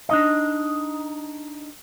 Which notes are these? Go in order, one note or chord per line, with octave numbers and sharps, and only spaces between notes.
D4 D#4 D#5